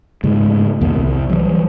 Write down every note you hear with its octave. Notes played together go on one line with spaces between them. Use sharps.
G#2 C#3 G#3 A3
B1 E2 D#3 B3
C2
E3 F#3 G3